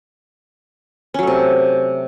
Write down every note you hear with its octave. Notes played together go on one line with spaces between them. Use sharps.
C3 F#3 A3 C#4